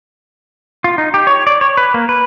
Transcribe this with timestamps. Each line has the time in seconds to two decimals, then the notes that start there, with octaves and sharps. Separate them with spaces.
0.84 F4
0.98 D#4
1.14 G4
1.27 C#5
1.47 D5
1.61 C#5
1.77 B4
1.94 A#3
2.09 B4